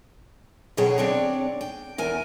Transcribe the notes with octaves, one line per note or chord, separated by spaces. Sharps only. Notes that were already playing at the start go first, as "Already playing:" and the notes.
B2 D3 F#3 G#4 C#5 G5
C4 D4 C#5 D5
G5
E2 A#4 G#5